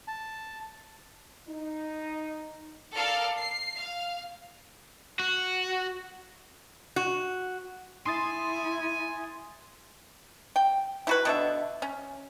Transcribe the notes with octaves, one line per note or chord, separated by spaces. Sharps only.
A5
D#4
A4 A#4 D5 F5 A5
C7
F5
F#4
F#4
E4 G#5 C6 D#6 A6
G5
E4 F#4 B4
B2 D3 E5
C#4